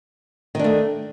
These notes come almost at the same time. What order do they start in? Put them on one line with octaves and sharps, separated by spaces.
D#3 D4 A3